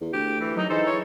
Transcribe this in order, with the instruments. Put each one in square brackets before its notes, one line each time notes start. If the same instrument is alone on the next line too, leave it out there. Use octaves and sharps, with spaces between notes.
[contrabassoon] E2
[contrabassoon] D2 [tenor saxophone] G4
[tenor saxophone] E3
[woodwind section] D#3 F#3 D#4
[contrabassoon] E3 [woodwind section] G#3 D#4 A4 [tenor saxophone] C5
[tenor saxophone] C#5